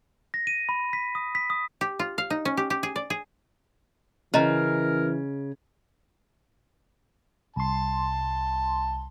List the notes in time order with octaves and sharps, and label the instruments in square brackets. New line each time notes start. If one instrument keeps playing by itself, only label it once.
[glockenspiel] A#6
D#7
B5
B6
D#6
B6
D#6
[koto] G4
F4
F5
D#4
C#4
G4
G4
G#4
D5
G#4
[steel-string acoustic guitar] C#3 [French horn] E3 [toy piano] C#4 D#5 A#5 [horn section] A#4
[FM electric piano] C2 C6 [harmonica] A5